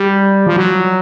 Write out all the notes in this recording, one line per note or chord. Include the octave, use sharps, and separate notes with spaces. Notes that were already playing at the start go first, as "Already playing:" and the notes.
Already playing: G3
F3
F#3